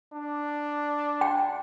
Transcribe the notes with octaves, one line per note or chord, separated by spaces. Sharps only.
D4
G5